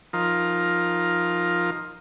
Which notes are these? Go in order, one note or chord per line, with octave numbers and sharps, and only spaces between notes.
F3 D#4 F4 A#4